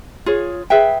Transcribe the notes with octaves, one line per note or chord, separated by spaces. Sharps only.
F4 G#4 C#5
G#4 B4 E5 G5